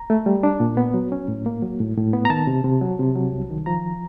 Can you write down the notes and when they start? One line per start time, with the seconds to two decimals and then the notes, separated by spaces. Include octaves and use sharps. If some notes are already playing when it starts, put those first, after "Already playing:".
Already playing: A#5
0.10 A3
0.26 G3
0.43 D4
0.60 A#2
0.77 B3
0.94 F#3
1.12 C#4
1.28 A2
1.46 A#3
1.62 F#3
1.80 A2
1.97 A2
2.13 B3
2.25 A#5
2.30 D#3 A5
2.47 C3
2.64 C3
2.81 F#3
2.99 C3
3.15 F#3
3.33 C2
3.50 D#3
3.66 F3 A#5